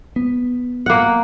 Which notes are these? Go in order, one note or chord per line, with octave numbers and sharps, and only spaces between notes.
B3
A#3 F#5